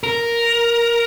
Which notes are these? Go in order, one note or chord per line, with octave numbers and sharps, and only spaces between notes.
A#4